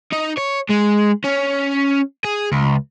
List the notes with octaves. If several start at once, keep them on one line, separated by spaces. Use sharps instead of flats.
D#4
C#5
G#3
C#4
G#4
C#2